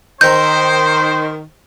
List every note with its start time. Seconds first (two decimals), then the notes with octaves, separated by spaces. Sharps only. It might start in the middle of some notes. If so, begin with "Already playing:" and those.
0.21 D#3 C4 C5 A#5 C6 G6